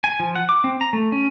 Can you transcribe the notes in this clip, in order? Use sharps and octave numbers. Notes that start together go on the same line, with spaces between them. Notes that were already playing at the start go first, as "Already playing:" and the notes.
G#5
F3
F#5
D6
C4
A#5
A3
C#4